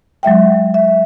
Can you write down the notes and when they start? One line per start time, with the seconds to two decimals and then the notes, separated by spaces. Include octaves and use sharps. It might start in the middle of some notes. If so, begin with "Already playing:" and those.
0.23 F#3 G#3 E5 G5
0.74 E5